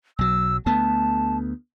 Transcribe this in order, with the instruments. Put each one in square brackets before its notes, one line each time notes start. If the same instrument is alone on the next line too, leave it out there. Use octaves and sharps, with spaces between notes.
[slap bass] B1 F#3 [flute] E6
[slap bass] D2 A3 B3 [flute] A5